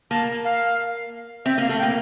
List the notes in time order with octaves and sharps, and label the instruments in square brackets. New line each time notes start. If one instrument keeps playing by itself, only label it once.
[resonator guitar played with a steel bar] A#3 [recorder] A5
[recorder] F5
[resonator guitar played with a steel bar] C4 [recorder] E5
[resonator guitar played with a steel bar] A#3 [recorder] F5
[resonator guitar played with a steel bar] A3
[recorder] G5
[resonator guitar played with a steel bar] A#3